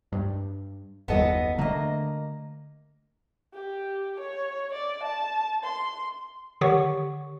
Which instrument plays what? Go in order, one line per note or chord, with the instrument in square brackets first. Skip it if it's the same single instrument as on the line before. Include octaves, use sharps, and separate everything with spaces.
[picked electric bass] G2
[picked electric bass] F#1 D#2 G3 [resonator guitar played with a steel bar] B3 A4 D#5
[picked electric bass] D3 A3 D4 [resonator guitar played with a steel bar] A#3 D#5
[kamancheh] G4
C#5
D5
A5
C6
[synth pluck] D3 D#3 G4 C#5 F#5 C#6